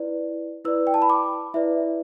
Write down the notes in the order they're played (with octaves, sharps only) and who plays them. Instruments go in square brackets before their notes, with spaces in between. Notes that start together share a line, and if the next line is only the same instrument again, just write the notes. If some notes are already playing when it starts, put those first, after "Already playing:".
Already playing: [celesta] E4 B4 D5
E4 B4 D5 E6
G5
A5
B5
D6
E4 B4 D5 E5